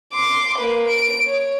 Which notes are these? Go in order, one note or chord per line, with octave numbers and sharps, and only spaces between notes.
C6 D6
A#3 B4
D7
C#5